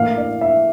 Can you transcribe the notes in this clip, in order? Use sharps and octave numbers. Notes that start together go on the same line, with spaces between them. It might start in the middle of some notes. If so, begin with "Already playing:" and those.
Already playing: A2 E3 A#3 E4 F5
D5
E5